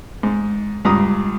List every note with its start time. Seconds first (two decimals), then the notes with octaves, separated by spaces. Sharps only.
0.23 G#2
0.85 C#2 G2 A#5 D#6